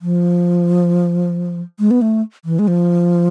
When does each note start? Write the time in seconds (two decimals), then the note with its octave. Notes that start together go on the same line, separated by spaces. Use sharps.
0.02 F3
1.79 G#3
1.91 B3
2.02 A3
2.45 E3
2.59 G#3
2.68 F3